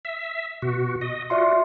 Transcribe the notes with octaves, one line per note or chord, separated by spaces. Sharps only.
E5
B2 F#4
D#5
F4 F#4 D5 E5 C6